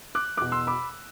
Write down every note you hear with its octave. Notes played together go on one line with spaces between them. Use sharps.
D6 F#6
E2 B2 D6 F#6
C6 E6
B5 D6